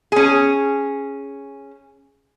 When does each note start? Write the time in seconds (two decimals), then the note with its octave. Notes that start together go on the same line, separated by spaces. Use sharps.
0.12 C#4 G#4